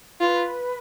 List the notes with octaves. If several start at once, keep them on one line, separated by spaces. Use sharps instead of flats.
F4 B4